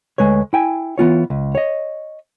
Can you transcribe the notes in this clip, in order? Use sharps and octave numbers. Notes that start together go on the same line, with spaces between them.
D2 A#2 G#3 B4 C#5
E4 G5 G#5
E3 B3 F4 C#5
C#2
C#5 D#5